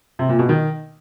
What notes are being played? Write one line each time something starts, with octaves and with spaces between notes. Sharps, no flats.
C3
A#2
B2
D#3